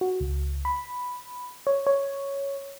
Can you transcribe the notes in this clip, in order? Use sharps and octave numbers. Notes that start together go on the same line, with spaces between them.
F#4
C#2
B5
C#5
C#5